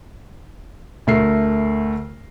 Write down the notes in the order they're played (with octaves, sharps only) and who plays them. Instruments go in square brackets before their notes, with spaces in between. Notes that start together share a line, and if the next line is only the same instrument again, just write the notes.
[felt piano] D2 A3 A#4 C7